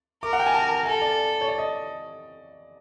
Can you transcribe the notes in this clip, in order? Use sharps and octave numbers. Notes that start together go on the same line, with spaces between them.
A#4 D6
F#5
G5
G#5
A5
A4 G#5
D5
C#5
D5
D#5